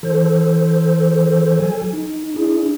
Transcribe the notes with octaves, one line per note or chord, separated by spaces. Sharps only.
E3 A4 C5
F#3 A4 G#5
D#4
D4 E4 G#4